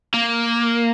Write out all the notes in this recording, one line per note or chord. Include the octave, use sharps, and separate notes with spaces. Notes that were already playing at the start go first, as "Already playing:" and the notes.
A#3